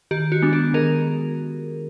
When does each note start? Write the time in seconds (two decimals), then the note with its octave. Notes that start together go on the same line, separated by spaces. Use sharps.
0.11 D#3 G4
0.32 F#4
0.42 G#3 B3 D4
0.53 G4
0.74 D#3 G#4 A#4